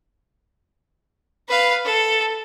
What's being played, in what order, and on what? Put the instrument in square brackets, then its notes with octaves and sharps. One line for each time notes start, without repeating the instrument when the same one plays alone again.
[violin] B4 F5
A4